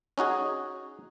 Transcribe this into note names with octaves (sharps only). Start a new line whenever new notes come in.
C#4 D#4 F#4 G#4